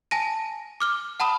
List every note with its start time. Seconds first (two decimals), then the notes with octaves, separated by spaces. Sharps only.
0.11 G#5 A5 A#6 D#7
0.80 D6 F6 G7
1.20 F#5 A5 B5 D#6